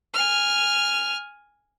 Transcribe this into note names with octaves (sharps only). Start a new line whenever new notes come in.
G#5 F6